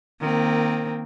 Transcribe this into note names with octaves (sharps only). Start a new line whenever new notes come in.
D#3 A#3 C4